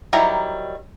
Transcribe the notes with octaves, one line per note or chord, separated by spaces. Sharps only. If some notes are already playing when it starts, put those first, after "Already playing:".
D#3 F#3 G3 E4 A#5